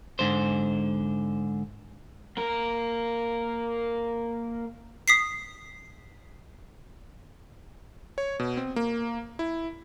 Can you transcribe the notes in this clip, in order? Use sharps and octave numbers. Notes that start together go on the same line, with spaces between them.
G#2 D3 C5
A#3 A#4
D#6 B6 C7
C#5
B2
C4
A#3
E4